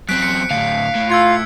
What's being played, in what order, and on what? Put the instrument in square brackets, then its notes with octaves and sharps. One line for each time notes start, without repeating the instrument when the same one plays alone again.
[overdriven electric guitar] F#2 C4 [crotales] F#6 B6 D7
[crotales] C#7
[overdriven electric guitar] D2 A2 [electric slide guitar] F5
[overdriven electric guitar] A2
[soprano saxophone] F4 [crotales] E6 G#6 C#7